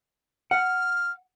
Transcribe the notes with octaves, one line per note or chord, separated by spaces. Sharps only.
F#5 F6